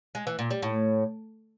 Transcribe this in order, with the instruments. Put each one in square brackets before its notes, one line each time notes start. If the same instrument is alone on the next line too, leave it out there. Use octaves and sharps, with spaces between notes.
[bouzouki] G#3
E3
A#2
G3
A2